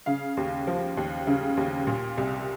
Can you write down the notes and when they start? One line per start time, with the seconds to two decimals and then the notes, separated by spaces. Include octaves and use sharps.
0.06 C#3 F5
0.37 D#2
0.67 F3
0.97 D#2
1.27 C#3
1.57 D#2
1.87 A#2
2.18 C2